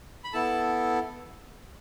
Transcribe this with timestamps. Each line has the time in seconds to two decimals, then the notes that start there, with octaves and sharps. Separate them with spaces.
0.24 B5
0.33 B3 E4 A4 A5